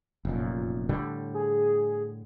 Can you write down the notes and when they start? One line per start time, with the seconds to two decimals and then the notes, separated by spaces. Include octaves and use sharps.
0.25 F1 F#2 A#2
0.89 A2 D3 G3
1.34 G#4